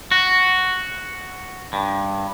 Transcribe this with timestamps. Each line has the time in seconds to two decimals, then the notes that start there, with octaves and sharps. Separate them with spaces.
0.11 F#4
1.73 G2